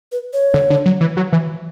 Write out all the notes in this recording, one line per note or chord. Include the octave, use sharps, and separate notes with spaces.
B4
C#5
D3
D3
F#3
E3
F#3
E3